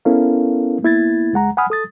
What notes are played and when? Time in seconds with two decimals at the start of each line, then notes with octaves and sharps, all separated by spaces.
0.05 B3 C#4 E4 A4 A#4 F5
0.82 A#3 B3 E4 G#6 A6
1.33 C#2 G#3 F#5 A#5
1.57 F#5 G#5 B5 D#6 F6
1.70 A4 D#6 A6